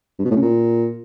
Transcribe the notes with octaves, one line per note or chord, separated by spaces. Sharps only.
G2
B2
A2
C#3
A#2